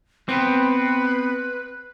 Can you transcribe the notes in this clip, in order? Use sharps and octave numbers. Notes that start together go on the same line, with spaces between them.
B3 C4 B4